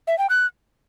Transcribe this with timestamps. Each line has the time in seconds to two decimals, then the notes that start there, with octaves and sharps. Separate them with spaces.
0.07 E5
0.19 G5
0.30 F#6